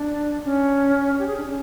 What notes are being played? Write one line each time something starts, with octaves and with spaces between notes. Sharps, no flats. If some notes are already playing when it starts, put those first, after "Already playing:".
Already playing: D4
C#4
G4
G#4
D4
C#4